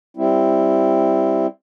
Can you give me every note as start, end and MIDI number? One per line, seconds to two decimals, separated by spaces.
0.17 1.47 55
0.17 1.47 60
0.17 1.47 64